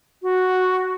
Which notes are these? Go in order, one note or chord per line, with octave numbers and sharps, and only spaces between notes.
F#4